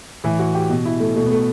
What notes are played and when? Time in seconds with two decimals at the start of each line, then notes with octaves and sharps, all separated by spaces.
0.24 A2 E3 E4
0.39 F#4
0.55 G4
0.70 B2
0.85 E4
1.00 A3
1.16 B2 A3
1.26 B3
1.31 A3